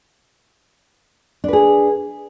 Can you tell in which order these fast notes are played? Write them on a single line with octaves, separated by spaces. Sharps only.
D4 B4 G#4